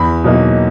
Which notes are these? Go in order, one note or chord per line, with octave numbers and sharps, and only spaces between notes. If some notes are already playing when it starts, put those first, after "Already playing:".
Already playing: E2 B5
B2 F#3 A#3 D#4